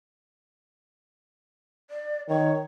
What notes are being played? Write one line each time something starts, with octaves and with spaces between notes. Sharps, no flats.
D5
D#3 C#5